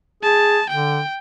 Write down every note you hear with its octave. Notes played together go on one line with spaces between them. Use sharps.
G#4 A5
D3 G5